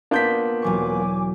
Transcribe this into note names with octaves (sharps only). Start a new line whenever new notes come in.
A#3 B3 D4 F4 G6 B6
E1 F#3 G#5 C#6 D6